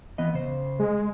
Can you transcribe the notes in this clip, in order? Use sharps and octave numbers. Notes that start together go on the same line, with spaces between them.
E3 B3 D#5
C#3 C5
G#3